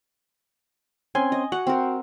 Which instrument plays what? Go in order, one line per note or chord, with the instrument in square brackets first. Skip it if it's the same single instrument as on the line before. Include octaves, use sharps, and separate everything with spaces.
[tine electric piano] C4 C#4 C6 [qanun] G#5
[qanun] D#5
[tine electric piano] F#4 [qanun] F#5
[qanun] C4 A#4